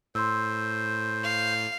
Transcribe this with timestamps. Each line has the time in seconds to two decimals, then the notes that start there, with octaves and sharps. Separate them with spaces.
0.15 A2 C5 C6 E6
1.24 F5